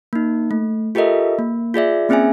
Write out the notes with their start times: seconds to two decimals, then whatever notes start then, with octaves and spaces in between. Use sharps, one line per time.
0.13 A#3 D#4
0.51 A3
0.95 F4 G4 A4 A#4 D#5 E5
1.39 A#3
1.74 F4 G#4 D5 E5
2.09 A#3 C4 C#4 G#4 E5 G#5